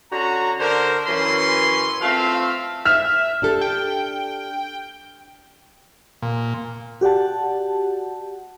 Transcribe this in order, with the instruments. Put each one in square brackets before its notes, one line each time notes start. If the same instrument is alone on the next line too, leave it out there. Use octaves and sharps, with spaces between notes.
[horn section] D3 C#4 F#4 A#5
D3 A#4 C5
F#2 E3 F#3 C#4 B4 C6
A3 C4 F4 E5 F5
[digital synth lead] E5 [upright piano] F6
[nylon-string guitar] D4 G4 A4
[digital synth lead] G5
[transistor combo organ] A#2
[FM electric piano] F#4 G4 D5 F#5 A5